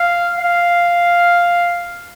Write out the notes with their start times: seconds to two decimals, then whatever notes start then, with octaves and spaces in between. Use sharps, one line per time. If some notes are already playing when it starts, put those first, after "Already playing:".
Already playing: F5
0.39 F5